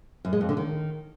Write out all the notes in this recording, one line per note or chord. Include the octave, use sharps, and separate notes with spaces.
F#2
G#3
F2
D3
D#3